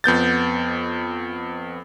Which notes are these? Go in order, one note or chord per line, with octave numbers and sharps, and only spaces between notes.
F2 B3 G6 A6